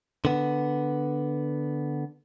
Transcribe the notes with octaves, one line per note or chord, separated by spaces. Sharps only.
D3 B3